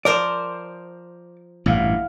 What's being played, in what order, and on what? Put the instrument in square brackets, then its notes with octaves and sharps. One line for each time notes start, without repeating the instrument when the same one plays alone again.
[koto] F3 A#4 C5 [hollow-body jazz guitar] D5
[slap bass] A1 G2 A#2 [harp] E4 F5 F#5